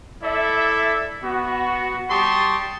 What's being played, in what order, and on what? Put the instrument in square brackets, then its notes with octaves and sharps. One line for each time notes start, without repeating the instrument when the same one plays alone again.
[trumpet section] E4 A4 D5 E5
B3 F#4
G3 G4 A5 C6 C#6 D#6